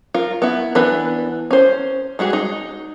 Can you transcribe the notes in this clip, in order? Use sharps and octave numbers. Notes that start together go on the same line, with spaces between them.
F4 A#4
B3 E4
E3 B3 D4 E4 B4
C#4 C5
G3 G#3 F#4 G#4
D#4